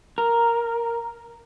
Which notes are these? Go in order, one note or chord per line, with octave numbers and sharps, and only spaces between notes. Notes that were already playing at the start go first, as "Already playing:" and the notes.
A#4